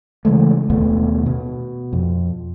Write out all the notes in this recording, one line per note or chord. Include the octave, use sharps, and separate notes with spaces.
C#3 E3 G#3 A3
D#2 B2 A3 B3
B2
F2